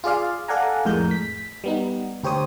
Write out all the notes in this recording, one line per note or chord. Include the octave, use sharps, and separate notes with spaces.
F4 G#4 D5 F5
A4 D5 F5 F#5 G#5 A#5
F2 A2 G#3 A#4 G6
B6
G3 B3 D#4
D2 G4 C5 C#5 D#6